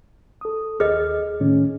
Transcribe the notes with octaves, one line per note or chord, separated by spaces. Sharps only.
A4 D#6
D#2 G#4 D#5 F6
A2 D#3 C#4